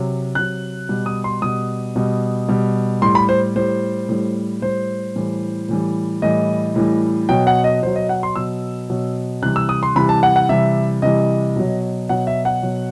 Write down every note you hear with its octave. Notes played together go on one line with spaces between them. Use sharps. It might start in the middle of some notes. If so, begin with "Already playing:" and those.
Already playing: C3 F#3
C3 F#3 F#6
B2 G3
D#6
C6
B2 G3 D#6
B2 G3
B2 G3
A2 G3 C6
B5
C5
A2 G3 C5
A2 G3
A2 G3 C5
A2 E3 G3
A2 E3 G3
A2 E3 G3 D#5
A2 E3 G3
B2 F#3 G5
F#5
D#5
B2 F#3 C5
D#5
F#5
C6
B2 F#3 E6
B2 F#3
C3 E3 G3 F#6
E6
D#6
C6
C3 E3 G3 B5
A5
F#5
F#5
C3 E3 G3 E5
C3 E3 G3 D#5
B2 F#3
B2 F#3 F#5
E5
F#5
B2 F#3